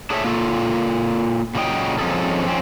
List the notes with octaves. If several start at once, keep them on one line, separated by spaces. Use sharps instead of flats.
D4 G#4 A4 C#5 D#5 E5
A#3 F4 A4
A#2 C#3 F#3 C5 D#5 G5
F3 C4 C#4 D#4 G#4 A4
F2 C4 C#4